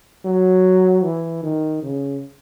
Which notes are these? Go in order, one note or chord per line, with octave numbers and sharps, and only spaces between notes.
F#3
E3
D#3
C#3